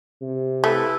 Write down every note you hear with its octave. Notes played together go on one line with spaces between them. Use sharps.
C3
A3 E4 A4 B4